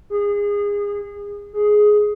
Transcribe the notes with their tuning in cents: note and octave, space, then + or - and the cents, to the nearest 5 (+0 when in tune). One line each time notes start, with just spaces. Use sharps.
G#4 -25
G#4 +10